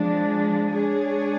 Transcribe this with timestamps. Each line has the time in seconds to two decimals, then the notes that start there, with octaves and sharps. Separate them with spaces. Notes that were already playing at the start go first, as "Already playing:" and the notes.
Already playing: F3 G#3 D4
0.74 G#3 D4 G#4 C#5